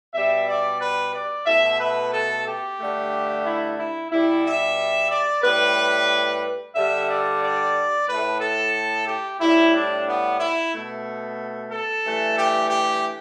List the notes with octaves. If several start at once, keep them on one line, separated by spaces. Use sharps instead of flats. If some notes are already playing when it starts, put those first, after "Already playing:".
B2 G3 E5
D5
B4
D5
B2 A3 E5
B4
A4
G4
G2 D3 A3
E4
E4
B2 G3 E4
E5
D5
A2 G3 B4
G2 D3 G3 E5
D5
D5
A2 A3 B4
A4
G4
A2 G3 E4
D4
B3
E4
B2 A3
A4
G2 E3 A3
G4
G4